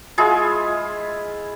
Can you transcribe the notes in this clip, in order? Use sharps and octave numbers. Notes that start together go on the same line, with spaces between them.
G#3 E4 F4 G#4